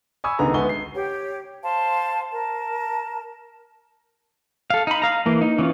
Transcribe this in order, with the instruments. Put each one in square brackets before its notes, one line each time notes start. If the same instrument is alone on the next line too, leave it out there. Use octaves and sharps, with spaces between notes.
[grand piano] G#5 B5 C#6 D#6 E6 G#6
C#2 D3 D#3 B3 G#4 A#5
D2 G#3 B3 G#5 C#6 G7
C7
[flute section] G4 C#5 G5
C5 F5 A5 C6
A#4 A5
[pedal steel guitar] A4 F5
D#4 B5
F5 A#5
E3 A#3
D#4
E3 C#4 F4